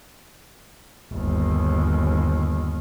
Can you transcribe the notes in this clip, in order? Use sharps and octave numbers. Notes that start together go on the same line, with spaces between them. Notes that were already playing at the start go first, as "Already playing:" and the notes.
G1 D#2